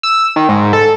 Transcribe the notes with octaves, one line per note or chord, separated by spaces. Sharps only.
E6
D#3
G#2
A4